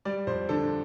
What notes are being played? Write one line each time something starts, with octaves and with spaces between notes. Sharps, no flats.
G3 D5
F2 C5
D3 A4